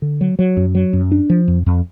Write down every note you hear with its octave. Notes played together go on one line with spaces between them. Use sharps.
D3
F#3
F#3
F#2
F#3
F#2
D4
F3
F2
F2